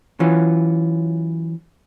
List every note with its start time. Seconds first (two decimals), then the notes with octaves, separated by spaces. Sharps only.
0.20 E3 F#3 C#4 F4